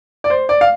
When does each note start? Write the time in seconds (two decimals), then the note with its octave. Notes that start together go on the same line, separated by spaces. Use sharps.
0.24 D5
0.30 C5
0.49 D5
0.61 F5